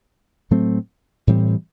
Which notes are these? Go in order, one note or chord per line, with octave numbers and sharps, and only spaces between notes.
A2 F#3 A3 C4
A2 E3 G3 C4